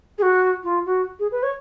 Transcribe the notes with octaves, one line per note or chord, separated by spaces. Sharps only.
G#4
F#4
F4
F#4
G#4
B4
C#5